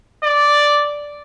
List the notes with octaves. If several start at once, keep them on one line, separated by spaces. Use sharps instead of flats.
D5